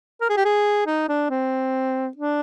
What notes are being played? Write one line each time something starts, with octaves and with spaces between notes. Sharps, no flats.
A#4
G#4
G4
G#4
D#4
D4
C4
D4